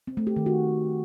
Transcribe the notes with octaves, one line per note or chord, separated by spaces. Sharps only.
C4
A3
G4
D#3
F#4